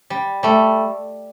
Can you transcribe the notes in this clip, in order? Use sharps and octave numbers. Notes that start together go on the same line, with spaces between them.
G3
G3 A3